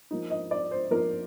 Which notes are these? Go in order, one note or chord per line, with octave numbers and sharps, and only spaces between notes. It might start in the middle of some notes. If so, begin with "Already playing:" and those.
F3 A#3 D#4
D#5
D5
C5
F3 A#3 D#4 A#4